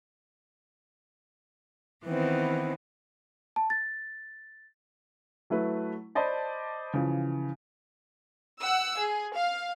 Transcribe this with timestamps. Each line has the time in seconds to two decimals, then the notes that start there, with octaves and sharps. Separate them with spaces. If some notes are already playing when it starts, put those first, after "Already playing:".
2.04 D#3 E3 B3 C4
3.56 A5
3.70 A6
5.50 F#3 A3 E4 B4
6.15 C5 D5 D#5 A5 B5 D6
6.94 C#3 E3 F3
8.61 F#5 E6
8.98 G#4
9.35 F5